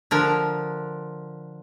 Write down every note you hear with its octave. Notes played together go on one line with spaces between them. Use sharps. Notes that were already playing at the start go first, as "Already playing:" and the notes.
D3 F3 A#4